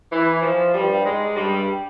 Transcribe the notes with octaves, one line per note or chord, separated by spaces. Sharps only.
E3
F3
G2 G3
G#2 G#3
G2 G3